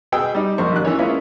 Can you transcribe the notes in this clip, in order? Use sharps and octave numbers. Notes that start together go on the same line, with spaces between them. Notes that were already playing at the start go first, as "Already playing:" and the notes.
B2 G#4 B4 G5 E6
G3 D#4
A#1 F2 B2 A#3 C5 C#6
A1 D#3 F#6
E3 C#4 C#5
G#3 A#3 B3 C#4 E4 F4